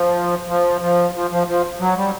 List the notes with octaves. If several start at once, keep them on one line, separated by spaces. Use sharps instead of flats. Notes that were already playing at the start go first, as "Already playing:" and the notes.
Already playing: F3
F3
F3
F3
F3
F3
F#3
G3